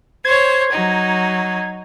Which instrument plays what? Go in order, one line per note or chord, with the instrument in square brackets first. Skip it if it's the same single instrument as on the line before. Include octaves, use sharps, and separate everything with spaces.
[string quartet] C5 C#5 [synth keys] G#6
[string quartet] F#3 D#4